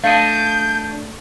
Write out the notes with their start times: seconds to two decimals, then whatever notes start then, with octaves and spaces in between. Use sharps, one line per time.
0.04 A3 D4 A4 D#5 F5 G6